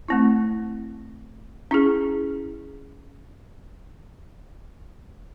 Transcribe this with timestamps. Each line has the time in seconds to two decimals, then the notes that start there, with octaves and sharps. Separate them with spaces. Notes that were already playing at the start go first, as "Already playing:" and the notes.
0.08 A3 C4 E4
1.71 C#4 E4 G#4